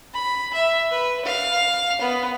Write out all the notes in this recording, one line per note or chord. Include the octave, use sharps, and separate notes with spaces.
B5
E5
B4
F5
B3